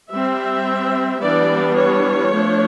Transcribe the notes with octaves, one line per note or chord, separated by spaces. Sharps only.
G3 C4 E5
E3 G3 B3 D4 D5
C#5
F3 A3 D4